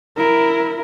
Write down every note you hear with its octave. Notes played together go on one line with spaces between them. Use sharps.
E4 A#4